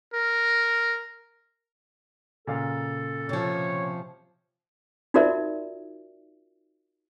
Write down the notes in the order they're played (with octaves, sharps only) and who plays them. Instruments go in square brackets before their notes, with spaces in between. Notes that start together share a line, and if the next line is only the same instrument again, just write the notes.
[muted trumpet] A#4
[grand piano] A#2 C#3 F5 [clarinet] A4
[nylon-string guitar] C3 F3 [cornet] C#5
[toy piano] D#4 F4 F#4 A#4 D5 E5